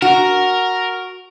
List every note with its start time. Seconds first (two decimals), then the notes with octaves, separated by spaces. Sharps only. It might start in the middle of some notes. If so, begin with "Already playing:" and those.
0.02 F#4 A#4